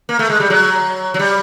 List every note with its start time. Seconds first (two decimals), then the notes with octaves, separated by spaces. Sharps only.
0.09 A#3
0.19 A3
0.30 G#3
0.40 G3
0.50 F#3
1.14 F#3
1.19 G3